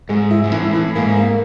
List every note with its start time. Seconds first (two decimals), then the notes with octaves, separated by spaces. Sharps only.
0.09 G#2 G#3
0.31 E4
0.44 G#2
0.52 A2 E3
0.73 E3
0.95 G#2 A#3
1.16 A#3